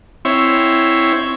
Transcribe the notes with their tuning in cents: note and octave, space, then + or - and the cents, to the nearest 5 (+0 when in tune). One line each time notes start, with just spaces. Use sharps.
C4 +0 E4 +0 C#5 +0